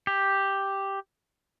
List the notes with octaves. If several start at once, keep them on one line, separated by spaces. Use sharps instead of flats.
G4